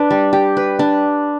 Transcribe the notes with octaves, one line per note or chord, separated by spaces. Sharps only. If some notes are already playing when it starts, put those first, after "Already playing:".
Already playing: D4 B4
G3
G4
B4
D4